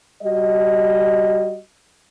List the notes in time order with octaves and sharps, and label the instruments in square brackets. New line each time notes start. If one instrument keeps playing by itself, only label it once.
[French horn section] G3 F#4 D#5